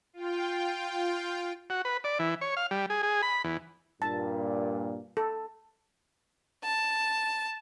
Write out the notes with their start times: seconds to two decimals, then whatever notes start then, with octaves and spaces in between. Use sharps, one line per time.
0.13 F4 G5
1.70 F#4
1.85 B4
2.04 D5
2.19 E3
2.41 C#5
2.57 F5
2.71 G3
2.90 G#4
3.03 G#4
3.23 B5
3.44 E2
4.02 G2 A#2 A5
5.17 A4
6.64 A5